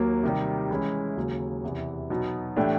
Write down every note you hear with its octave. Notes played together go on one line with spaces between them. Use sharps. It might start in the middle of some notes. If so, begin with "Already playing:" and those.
Already playing: D#2 F#3 A#3
C3 D#3 G3
E3 G#3 C#4 E4
D#2 C#3 F#3
E2 C3 E3
B2 F#3 B3 D#4
A2 E3 A3 D4 G4